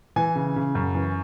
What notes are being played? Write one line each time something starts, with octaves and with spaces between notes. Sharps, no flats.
E3 G#5
C#3
C#3
F#2
E3